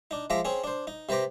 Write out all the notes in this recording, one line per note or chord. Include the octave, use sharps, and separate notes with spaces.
D4 D#4
F3 G#3 E5 A#5 D6
C4 C#4 G#4
D4 C5
D#4
C3 B4 C5 A#5 D6